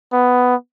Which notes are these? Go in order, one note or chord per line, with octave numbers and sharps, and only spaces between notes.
B3